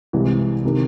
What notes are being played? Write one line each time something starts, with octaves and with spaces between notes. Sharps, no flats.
C2 C3 E3 G#3
C3 D#3